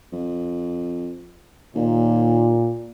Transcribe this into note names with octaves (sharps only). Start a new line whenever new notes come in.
F2
D#2 A#2